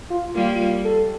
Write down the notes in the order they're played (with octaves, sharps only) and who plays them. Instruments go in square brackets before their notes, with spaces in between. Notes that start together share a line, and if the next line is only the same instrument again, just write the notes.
[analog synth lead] F4
[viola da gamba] G3 A#3 [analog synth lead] F4
[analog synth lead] A4